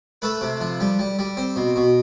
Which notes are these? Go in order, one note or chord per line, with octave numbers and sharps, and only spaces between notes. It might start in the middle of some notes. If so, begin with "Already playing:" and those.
A3 A4 B4
C3
F3
G3
G3
G3
C4
B2
B2